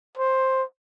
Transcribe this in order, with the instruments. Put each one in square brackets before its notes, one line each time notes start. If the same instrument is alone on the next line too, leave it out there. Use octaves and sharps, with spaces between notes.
[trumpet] C5